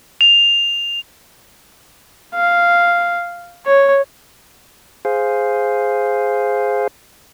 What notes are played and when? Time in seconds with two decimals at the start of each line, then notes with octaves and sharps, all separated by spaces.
0.21 F7
2.35 F5
3.66 C#5
5.05 G#4 C5 F5